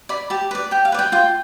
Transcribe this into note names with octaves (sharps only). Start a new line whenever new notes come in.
D5 B5
G4 A5
B4 D5
G4 G5
F5
B4 D5
G5
F4 G5